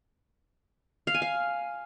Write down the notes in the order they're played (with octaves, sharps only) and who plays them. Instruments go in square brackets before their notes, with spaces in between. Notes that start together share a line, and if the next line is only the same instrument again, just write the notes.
[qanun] F5
G#5
F5